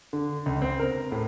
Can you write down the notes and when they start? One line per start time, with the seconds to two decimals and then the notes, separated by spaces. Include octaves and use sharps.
0.13 D3
0.46 C#2
0.62 C4
0.80 A#4
1.12 A2